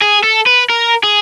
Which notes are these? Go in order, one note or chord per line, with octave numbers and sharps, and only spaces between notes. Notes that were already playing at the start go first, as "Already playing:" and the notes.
G#4
A4
B4
A#4
G#4